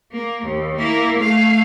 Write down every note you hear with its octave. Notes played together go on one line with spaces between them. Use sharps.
A#3
D#2
A#3 E4
A3 F5